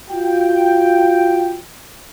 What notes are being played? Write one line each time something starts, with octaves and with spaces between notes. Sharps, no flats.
F4 F#4 G5